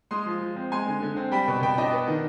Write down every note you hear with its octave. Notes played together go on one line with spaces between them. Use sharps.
G#3 C6 D#6
F3
F3
C4
G#3 G#5 C6
D3
D3
C4
G3 G5 B5
B2
B2 G5 B5
D4 D#5 G5
B3
D#3